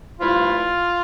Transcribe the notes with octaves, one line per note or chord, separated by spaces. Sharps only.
G2 F3 A3 E4 F4